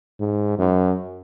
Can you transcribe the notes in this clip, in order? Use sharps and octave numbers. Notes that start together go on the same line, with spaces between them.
G#2
F#2